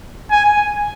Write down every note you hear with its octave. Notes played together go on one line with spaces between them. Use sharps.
G#5